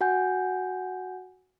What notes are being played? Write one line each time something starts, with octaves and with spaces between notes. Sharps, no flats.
F#4 F#5 G#5 G6